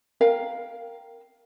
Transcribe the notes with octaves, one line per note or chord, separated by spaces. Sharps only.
A#4 F5 G5